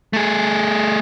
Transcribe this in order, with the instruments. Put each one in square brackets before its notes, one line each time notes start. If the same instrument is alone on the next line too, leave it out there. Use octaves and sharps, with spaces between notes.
[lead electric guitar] A3 G#4